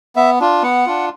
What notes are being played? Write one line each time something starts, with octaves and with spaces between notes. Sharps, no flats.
B3 E5
D4 F4
B3 F#5
D4 F4